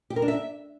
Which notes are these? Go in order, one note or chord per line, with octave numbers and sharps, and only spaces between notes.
G4
A#4
D4
E5